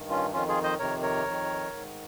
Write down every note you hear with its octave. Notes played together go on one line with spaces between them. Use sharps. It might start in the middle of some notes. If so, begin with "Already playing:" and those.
Already playing: G2 D#3
C#4 F4
F2 D#3 C#4 F4
F4 G#4
C5 D#5
F2 C3 D#3 A#4 C#5
A#4 C#5
F2 D#3
G#2 D#3